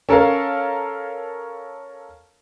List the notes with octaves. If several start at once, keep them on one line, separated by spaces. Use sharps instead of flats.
C#4 A4 A#4 C#5 F5